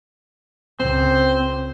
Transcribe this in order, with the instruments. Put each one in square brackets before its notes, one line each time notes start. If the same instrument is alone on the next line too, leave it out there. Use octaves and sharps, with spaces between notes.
[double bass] C#2 [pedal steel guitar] C4 [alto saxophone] C5